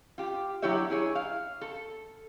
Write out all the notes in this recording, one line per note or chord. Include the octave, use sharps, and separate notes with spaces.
F4 G4
F#3 D4 E4 G4 C#5 E5
E4 G#4 C#5
F5
A4